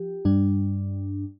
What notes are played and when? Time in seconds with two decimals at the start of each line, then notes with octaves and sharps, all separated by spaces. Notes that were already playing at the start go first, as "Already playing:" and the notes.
Already playing: F3 G4
0.25 G2 G3 D4